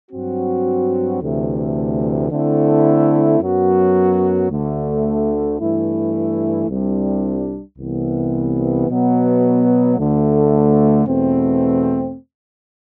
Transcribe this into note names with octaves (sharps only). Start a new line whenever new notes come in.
G2 F#3 C4 F#4
D2 C3 E3 A3
D3 A3 C4 E4
F#2 F#3 B3 F#4
D2 D3 A3
G2 E3 A3 E4
C2 C3 G3 D4
C2 C3 E3 B3
B2 F#3 B3 F#4
D2 D3 A3
E2 B2 A3 C4